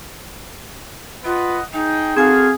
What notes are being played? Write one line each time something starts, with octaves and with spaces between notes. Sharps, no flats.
F4 B4 D#5 F#5
D#4 G#4 D#5 G5
C4 F#4 G#4 A4 F5 G#5